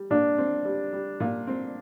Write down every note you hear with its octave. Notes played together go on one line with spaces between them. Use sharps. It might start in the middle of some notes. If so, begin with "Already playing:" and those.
Already playing: G3
A#2 D4
C4
G3
G3
A#2
C4